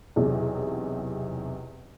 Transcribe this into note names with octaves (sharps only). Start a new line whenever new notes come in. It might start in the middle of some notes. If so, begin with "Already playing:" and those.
B1 E2 C3